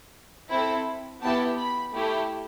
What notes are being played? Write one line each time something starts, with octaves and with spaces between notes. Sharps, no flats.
C4 E4 A4
B3 E4 G4 A5
B5
A3 E4 G4